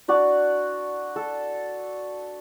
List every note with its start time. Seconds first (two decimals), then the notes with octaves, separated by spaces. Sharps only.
0.08 D4 F#4 D5
1.16 A4